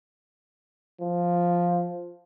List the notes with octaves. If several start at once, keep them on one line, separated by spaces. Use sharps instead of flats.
F3